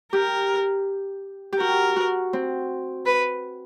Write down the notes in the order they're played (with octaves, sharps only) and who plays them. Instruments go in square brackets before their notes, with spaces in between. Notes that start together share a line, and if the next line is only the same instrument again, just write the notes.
[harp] G4 [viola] A#4
[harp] G4
[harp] F#4 [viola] A#4
[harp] F#4
C4
[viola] B4